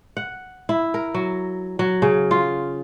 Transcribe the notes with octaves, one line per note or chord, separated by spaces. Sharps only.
F#5
E4
A#4
F#3
F#3
C#3
F4